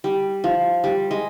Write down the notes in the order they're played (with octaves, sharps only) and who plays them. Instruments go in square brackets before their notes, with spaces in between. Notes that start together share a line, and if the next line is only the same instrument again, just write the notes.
[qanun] G3
F3
G3
G#3